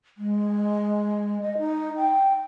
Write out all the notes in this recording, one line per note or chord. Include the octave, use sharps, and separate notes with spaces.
G#3
D#5
D#4
G5